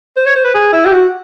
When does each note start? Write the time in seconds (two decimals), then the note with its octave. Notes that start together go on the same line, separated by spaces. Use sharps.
0.17 C5
0.26 C#5
0.35 C5
0.44 B4
0.54 G#4
0.73 E4
0.86 G4
0.92 F#4